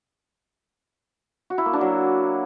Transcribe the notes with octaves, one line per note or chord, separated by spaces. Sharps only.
F#4
E4
A#3
D4
F#3